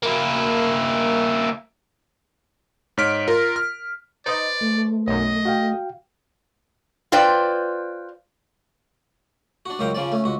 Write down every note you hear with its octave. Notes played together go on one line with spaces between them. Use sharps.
A#3 E4
G#2 C#5 F6 B6 D7
F4 A#4
F6
D#4 B4 C5 D5 D#5
A3
B1 F#2 D#5
F#4 F5 G5
F4 B4 C5 D5 G5
D4 F#4
C#2 F#2 F#4 F5 G5 A#5
C#3 F3 C#4 D5
A3 C#4
C#2 F#4